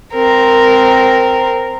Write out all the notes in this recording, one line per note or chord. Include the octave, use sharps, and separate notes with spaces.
C4 A#4